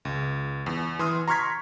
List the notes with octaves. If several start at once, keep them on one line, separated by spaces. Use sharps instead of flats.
C#2
E2
E3 C6 D#6 F6
A#5 C6 C#6 F6 G#6 B6